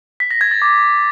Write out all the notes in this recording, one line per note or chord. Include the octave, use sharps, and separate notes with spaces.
B6
A#6
G#6
A6
D6